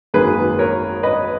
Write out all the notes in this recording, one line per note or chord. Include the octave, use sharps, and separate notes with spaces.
G#1 F#2 D#3 A#3 G#4 B4
A#4 C#5
B4 D#5